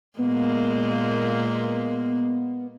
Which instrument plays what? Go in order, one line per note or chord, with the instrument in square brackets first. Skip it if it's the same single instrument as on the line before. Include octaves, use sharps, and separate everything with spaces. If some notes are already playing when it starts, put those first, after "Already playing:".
[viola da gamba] A#2 G#3 A#3 [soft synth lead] B3